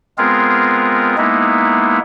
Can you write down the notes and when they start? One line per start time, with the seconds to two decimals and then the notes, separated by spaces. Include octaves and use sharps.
0.18 G#3 B3 C4 F4 G#4 A#4
1.18 G#3 A#3 B3 D#4 E4